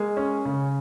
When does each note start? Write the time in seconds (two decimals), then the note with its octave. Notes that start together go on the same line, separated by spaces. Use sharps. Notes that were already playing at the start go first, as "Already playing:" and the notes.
Already playing: G#3 A#3
0.17 C#4
0.45 C#3